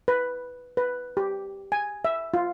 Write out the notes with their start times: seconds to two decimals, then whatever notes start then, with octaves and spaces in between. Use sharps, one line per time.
0.08 B4
0.77 B4
1.17 G4
1.72 G#5
2.05 E5
2.34 F4